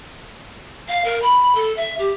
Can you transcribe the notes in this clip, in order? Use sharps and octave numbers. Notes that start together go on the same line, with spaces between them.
F5
A#4
B5
A4
E5
G4